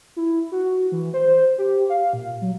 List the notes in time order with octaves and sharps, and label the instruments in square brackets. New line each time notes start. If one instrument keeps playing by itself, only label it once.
[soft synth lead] E4
F#4
E3
C5
G4
F5
A#2
F#3